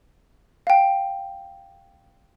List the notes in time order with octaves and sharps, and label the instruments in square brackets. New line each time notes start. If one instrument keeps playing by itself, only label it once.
[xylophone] F5 G5